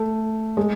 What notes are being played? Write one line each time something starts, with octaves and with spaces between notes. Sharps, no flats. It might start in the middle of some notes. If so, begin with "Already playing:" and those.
Already playing: A3
G#3